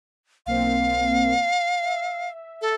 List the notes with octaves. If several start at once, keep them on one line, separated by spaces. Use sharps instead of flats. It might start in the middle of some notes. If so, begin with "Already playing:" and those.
B1 A#3 C4 F5
E5
A4